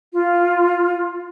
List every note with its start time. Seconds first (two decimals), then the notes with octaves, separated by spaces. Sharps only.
0.13 F4